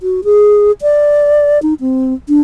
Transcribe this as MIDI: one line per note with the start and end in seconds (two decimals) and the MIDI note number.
0.01 0.21 66
0.24 0.71 68
0.82 1.61 74
1.62 1.74 63
1.81 2.14 60
2.29 2.41 62